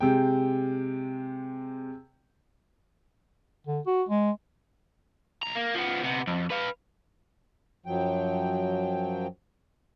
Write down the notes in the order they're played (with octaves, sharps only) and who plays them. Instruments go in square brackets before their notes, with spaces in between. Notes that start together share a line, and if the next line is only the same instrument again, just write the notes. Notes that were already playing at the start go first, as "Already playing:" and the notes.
[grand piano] C3 G#3 G5
[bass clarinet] D3
F#4
G#3
[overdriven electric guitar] B1 A#5
A#3
F3 B3
C3 B3
F2
B4 F5
[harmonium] F#2 F3 F#3 G5